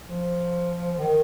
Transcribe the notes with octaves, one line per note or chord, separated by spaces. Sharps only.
F3
D#3